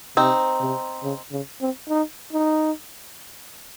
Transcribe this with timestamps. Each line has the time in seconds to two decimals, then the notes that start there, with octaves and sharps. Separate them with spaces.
0.17 C3 C4 D#4
0.60 C3
1.03 C#3
1.32 C#3
1.61 C4
1.89 D#4
2.33 D#4